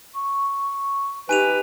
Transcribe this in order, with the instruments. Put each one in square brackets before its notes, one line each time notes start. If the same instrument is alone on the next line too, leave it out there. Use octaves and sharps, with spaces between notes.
[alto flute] C#6
[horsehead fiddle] D#4 G4 [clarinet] B4 [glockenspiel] G#5 D#7 F7